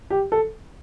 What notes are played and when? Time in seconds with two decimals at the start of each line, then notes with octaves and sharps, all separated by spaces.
0.10 G4
0.32 A4